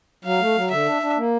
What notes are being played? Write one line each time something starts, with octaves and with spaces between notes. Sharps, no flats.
F#3 F5
A3
F#3
D3 E5
D4
D4
A#3